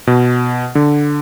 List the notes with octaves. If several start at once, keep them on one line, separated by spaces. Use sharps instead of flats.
B2
D3